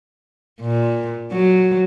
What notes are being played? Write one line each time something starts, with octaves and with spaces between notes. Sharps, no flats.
A#2
F#3